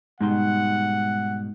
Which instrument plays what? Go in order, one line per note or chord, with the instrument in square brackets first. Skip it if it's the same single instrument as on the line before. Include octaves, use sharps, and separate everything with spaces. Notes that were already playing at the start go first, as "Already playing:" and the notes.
[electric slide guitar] G#2 B2 G3 [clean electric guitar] G#3 D#4 C6 [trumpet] F#5